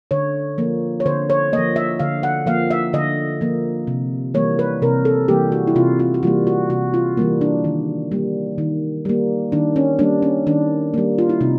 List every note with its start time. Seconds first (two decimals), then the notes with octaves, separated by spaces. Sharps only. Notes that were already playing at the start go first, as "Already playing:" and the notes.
0.11 D3 C#5
0.58 F3 A#3
1.00 C#5
1.06 D3 C5
1.30 C#5
1.53 F3 A#3 D#5
1.76 E5
1.99 D3 F5
2.23 F#5
2.46 F3 A#3 F5
2.71 E5
2.93 D3 D#5
3.41 F3 A#3
3.87 C3
4.34 E3 G3 A#3 C#5
4.59 B4
4.82 C3 A#4
5.05 A4
5.28 E3 G3 A#3 G4
5.52 F#4
5.67 E4
5.75 C3 F4
6.00 F4
6.14 F#4
6.23 E3 G3 A#3 F4
6.47 F#4
6.70 C3 F#4
6.94 F4
7.17 E3 G3 A#3
7.41 D4
7.64 D#3
8.12 G3 A#3
8.58 D#3
9.05 G3 A#3
9.52 D#3 D4
9.76 C#4
9.99 G3 A#3 D4
10.22 C#4
10.47 D#3 D4
10.94 G3 A#3
11.18 F4
11.29 E4
11.41 C3 D#4